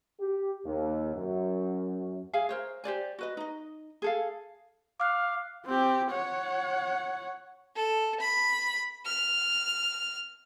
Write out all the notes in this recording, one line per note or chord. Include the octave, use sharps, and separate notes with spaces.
G4
D#2
F#2
G#4 E5 F5 G#5
A#4 C5 C#5
G4 C5 D5 G#5
F#4 B4 D#5
D#4 D#5
G#4 A4 F5
F5 D6 F6 F#6
C4 G4
C#5 F#5
A4
B5
F6